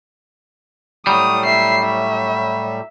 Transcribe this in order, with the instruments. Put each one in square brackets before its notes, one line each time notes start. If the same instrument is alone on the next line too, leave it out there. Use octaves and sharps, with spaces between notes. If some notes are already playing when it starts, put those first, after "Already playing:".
[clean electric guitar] A2 F#3 G3 [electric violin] D#6
[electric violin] E5 C7
E5